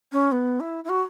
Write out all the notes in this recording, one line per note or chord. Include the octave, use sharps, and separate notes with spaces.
C#4
B3
E4
E4
F#4